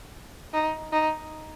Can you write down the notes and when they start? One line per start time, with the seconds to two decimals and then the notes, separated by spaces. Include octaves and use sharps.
0.53 D#4
0.92 D#4